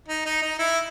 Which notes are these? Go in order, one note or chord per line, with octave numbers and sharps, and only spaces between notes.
D#4
D#4
D#4
E4